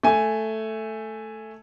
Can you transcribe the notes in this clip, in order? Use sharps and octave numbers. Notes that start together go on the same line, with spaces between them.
A3 G#5